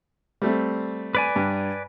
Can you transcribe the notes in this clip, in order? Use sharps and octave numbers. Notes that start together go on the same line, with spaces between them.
G3 A3 C4
B4 D5 G#5
G2